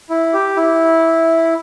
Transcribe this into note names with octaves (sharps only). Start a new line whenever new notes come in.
E4
G4
E4